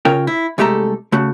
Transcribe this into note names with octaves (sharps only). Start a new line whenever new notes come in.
C#3 F4 A#4 C#5 G5
E4
C2 G#3 A3 G4 A4 A#5
C#3 A3 F#4